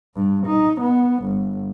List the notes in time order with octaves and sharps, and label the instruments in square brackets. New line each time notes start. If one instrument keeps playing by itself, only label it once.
[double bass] G2
D#4
B3
G1